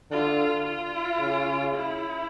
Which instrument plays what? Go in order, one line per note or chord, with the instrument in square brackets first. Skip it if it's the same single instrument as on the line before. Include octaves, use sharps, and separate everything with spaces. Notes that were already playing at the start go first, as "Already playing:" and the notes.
[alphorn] D3 [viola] F4
[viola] F4
[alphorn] C#3
[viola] E4